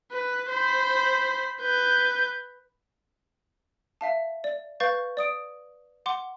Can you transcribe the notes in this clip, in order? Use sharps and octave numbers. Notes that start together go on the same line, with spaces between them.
B4
C5 B5
B4 G6
E5 F5 A5
D5
B4 F5 C#6 G6 A6
D5 D#6 D7
F#5 C6 D6